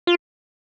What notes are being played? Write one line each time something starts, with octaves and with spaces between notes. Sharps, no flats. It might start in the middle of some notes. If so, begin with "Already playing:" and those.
F4